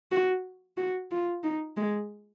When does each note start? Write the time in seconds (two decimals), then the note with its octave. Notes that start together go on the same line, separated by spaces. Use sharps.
0.12 F#4
0.77 F#4
1.11 F4
1.44 D#4
1.77 G#3